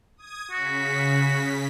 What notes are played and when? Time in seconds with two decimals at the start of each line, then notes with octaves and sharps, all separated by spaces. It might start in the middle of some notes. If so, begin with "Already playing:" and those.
0.17 D#6 G#6
0.51 C#3 F#4 B6